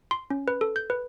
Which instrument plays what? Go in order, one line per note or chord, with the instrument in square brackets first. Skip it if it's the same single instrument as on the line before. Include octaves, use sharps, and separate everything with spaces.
[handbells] C6
C#4
B4
A4
G6
B4